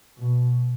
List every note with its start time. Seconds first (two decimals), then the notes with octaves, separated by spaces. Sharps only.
0.18 B2